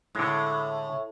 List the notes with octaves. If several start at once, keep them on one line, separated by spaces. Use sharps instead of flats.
A2 D3 G#3